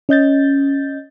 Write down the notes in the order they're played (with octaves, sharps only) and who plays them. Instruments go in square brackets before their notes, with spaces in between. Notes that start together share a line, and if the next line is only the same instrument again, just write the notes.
[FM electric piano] C#4 D#5 G6 A6